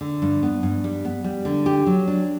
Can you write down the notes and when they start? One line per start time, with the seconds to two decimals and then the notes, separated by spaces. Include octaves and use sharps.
0.01 D3
0.22 G2
0.43 B3
0.63 G2
0.84 G3
1.05 B3
1.24 G3
1.45 D3
1.66 G4
1.87 F#3
2.07 D4